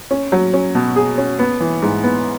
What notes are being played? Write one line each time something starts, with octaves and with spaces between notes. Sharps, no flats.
C#4
F#3
C#4
B2
G#4
C#4
B3
E3
G#2
B3